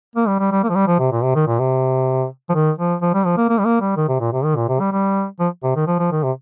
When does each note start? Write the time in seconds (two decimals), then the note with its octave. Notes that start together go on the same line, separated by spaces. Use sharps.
0.16 A#3
0.27 G3
0.40 G3
0.52 G3
0.63 A#3
0.69 F3
0.75 G3
0.87 F3
0.99 C3
1.12 A#2
1.23 C3
1.35 D#3
1.47 A#2
1.59 C3
2.49 F3
2.54 D#3
2.78 F3
3.02 F3
3.14 G3
3.25 F3
3.37 A#3
3.49 A#3
3.59 G3
3.65 A#3
3.81 G3
3.97 D#3
4.08 C3
4.20 A#2
4.33 C3
4.44 D#3
4.56 A#2
4.68 C3
4.80 G3
4.92 G3
5.40 F3
5.63 C3
5.76 D#3
5.87 F3
5.99 F3
6.12 D#3
6.23 C3